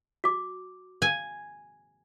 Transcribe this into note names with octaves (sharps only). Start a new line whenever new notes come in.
F#4 D6
G#5